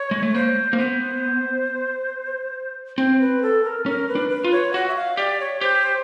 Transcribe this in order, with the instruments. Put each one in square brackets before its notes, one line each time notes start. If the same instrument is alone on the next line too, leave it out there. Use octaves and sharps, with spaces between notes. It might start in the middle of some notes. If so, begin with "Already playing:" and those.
Already playing: [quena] C#5
[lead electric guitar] G#3
A3
[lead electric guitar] A#3 [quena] C5
[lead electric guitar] A#3
[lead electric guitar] B3 [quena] C5
[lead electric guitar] C4 [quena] C5
[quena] B4
A4
A#4
[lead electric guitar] C#4 [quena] A#4
[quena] B4
[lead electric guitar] D4
[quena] B4
[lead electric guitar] F4
[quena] C#5
[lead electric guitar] F#4 [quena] F#5
[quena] E5
F5
[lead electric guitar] G4 [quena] D5
[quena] C#5
[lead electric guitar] G4 [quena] C5